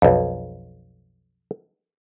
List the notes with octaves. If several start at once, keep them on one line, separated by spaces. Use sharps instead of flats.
B1 F2